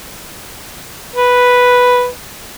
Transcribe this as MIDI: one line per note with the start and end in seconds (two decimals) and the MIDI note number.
1.16 2.07 71